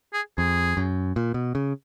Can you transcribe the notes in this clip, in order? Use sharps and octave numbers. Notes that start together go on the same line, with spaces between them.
G#4
F2 G#4
F#2
A#2
B2
C#3